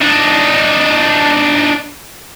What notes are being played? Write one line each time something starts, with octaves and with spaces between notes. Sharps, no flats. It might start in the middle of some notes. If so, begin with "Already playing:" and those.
D4 D#4